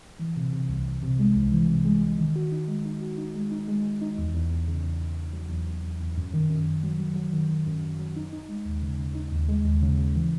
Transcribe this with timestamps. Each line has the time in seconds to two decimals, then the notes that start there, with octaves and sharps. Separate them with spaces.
0.19 E3
0.36 C3
0.52 C3
0.69 C2
0.86 C2
1.03 C3
1.19 G#3
1.36 C2
1.52 E3
1.68 C3
1.85 G#3
2.02 C2
2.18 D#3
2.36 F#4
2.52 D#4
2.68 G#3
2.85 D#4
3.02 F#4
3.18 D#4
3.35 G#3
3.51 D#4
3.68 G#3
3.84 G#3
4.01 D#4
4.18 E2
4.34 E2
4.50 E2
4.68 C#3
4.83 E2
5.00 E2
5.16 C#3
5.33 F#3
5.50 E2
5.66 E2
5.83 E2
6.00 E2
6.17 F#2
6.33 D#3
6.50 F#2
6.66 F#2
6.83 F#3
7.00 F#3
7.16 F#3
7.33 D#3
7.50 D#3
7.66 F#2
7.83 F#2
7.99 F#3
8.16 D#4
8.33 D#4
8.49 G#3
8.65 D#2
8.82 C#3
8.98 C#3
9.15 D#4
9.32 D#2
9.48 G#3
9.65 D#2
9.82 C#3
9.98 C#3
10.15 E3